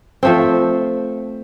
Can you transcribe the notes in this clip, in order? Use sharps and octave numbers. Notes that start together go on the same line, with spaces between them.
F3 A3 C4